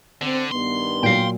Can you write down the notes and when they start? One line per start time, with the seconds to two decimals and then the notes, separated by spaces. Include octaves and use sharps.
0.21 D3 C4
0.52 G2 D#3 B3 C6
1.03 A#2 F#3 F5 G5